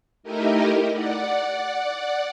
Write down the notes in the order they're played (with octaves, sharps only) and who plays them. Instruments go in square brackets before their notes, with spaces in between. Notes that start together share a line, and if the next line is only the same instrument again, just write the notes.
[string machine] A3 D#4 E4 G4 A#4 D#5
D5 F#5